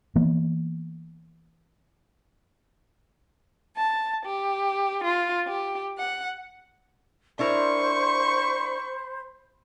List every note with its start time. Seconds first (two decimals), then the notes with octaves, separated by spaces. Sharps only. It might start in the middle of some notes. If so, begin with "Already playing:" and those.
0.16 E3 A#3 B3
3.77 A5
4.27 G4
5.05 F4
5.47 G4
5.98 F#5
7.39 D4 E4 A#4 C5 B5 C#6